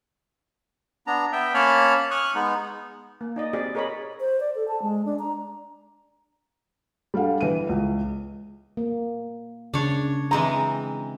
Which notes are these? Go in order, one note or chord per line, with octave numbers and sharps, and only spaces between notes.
B3 D4 A#5
B3 E5 G5
A#3 C#4 C#5 A5 B5 F6
C#6 D#6 F6 F#6
G#3 B3 D#4
A#3
D#4 D5 D#5
C4 G4 G#4 D5
G#4 A#4 C#5 D#5 B5
C5
D5
A4
A5
G#3
D4
A#5
G3 D4 A4 F5 F#5
E3 D#7
C#2
A#3
C#3 D4 C#5
E3 G#3 C4 A#5